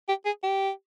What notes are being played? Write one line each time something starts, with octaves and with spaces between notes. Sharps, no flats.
G4
G#4
G4